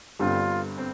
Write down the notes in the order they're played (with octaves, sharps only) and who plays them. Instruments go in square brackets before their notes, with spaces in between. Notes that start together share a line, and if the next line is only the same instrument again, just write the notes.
[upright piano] G1 G2 D3 G3 C4 [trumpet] F4
[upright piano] C4